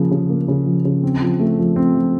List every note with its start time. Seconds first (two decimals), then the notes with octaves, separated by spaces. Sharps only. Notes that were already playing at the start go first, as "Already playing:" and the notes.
Already playing: C#3 F3 A#3
0.11 C#3
0.30 A#3
0.48 C#3
0.66 F3
0.85 C#3
1.03 C4
1.22 F3
1.40 A3
1.59 F3
1.76 C4
1.95 F3